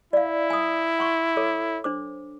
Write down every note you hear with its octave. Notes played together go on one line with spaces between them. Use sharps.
E4 D5 F5
G#5 D#6
F#5 C6 C#6
A4 C#5 D6
D4 C5 D6